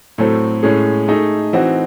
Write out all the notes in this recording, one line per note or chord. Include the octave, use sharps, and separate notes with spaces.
A2 F#3 A3 C4
A2 G#3 C#4 G#4
A3 D#4 G#4
E3 C4 D#4 F#4